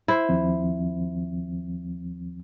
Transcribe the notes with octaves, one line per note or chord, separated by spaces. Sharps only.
E4 C5
D#2 F3 C4